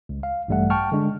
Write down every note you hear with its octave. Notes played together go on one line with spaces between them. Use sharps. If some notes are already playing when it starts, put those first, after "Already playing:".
C#2
F5
A1 G2 G3 A3 F#5
G5 A5 C#6 F6
D3 G#3 D4